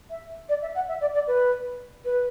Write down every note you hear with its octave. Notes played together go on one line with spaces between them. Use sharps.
E5
D5
E5
F#5
E5
D5
D5
B4
B4